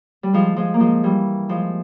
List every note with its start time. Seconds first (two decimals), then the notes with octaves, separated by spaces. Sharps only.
0.23 G3
0.33 F3 G#3
0.56 F3 G#3
0.74 A#3
0.80 F3 G#3
1.03 E3 G3
1.49 F3 G#3